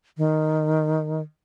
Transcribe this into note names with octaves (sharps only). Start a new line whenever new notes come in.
D#3